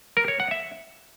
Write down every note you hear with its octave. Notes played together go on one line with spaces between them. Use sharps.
A#4
C#5
F#5
E5